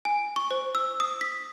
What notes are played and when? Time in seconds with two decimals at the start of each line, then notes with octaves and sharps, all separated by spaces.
0.05 G#5
0.36 C#6
0.51 C5
0.75 E6
1.00 D#6
1.21 B6